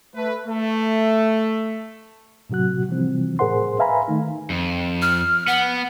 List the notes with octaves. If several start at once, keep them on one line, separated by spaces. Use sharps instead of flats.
A3 B4
A3
A2 C3 F#3 F#4 F#6
C3 E3 F3 G3 C4
A2 G#4 A#4 C5 F#5 C6
B4 E5 F5 G#5 A#5 B5
D#3 A3 D#4
F2
F6
B3 F#5